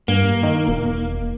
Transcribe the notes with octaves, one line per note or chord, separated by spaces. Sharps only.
G2 A#3
D#3
E1